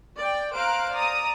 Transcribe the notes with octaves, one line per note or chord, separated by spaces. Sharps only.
D5 G5
C5 F5 A#5 F#6 D7
D5 A#5 D#6